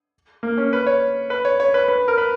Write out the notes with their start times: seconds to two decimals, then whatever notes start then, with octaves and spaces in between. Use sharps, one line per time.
0.43 A#3
0.58 C#4
0.73 B4
0.87 C#5
1.30 B4
1.45 C#5
1.60 C#5
1.74 B4
1.88 B4
2.08 A#4
2.18 B4